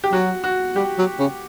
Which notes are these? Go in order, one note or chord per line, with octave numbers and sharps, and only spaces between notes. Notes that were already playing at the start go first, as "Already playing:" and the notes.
G4
F#3 F#4
F#4
G3 G4
F#3
C#3